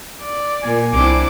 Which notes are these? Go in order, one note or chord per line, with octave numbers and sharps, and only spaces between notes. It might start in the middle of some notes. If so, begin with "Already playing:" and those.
D5
A#2 G#5
C2 C4 D4 E4 D6